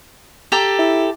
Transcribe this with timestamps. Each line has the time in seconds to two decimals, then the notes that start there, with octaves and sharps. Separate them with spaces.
0.52 G4 A4 A#5
0.79 E4